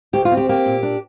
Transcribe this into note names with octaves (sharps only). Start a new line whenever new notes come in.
D2 G4
F4
C4
G4
A#3 G4
A#2
D4